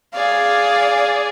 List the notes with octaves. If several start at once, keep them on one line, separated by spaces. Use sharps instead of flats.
G#4 D5 F5